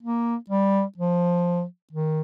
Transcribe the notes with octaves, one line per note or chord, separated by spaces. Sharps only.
A#3
G3
F3
D#3